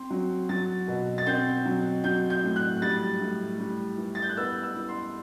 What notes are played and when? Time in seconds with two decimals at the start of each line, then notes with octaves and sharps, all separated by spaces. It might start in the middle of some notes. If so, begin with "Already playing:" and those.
Already playing: C4 C6
0.10 F#3
0.49 F#3 A6
0.88 B2
1.18 A6
1.27 C4 G6
1.65 F#3
2.04 F#3 G6
2.30 G6
2.43 A2
2.56 F#6
2.82 G3 A6
3.21 A2
3.60 G3
3.98 E3
4.15 A6
4.22 G6
4.30 F#6
4.37 B3 E6
4.63 E6
4.76 E3
4.89 C6